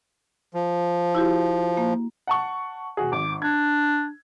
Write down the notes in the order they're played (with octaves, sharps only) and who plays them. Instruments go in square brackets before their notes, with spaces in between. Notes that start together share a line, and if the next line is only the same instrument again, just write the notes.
[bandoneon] F3
[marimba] E4 F#4 G4
A#3
[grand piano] F#5 A5 C#6
E1 F#4 G#4
[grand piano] G#1 [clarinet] D6
[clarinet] D4 [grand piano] G#6